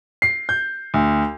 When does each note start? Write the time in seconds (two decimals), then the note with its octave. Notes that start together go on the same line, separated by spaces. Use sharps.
0.22 C7
0.49 G6
0.94 D2